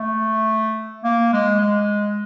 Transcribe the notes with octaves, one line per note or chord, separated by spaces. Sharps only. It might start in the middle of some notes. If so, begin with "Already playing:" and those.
Already playing: A3
A#3
G#3
G#3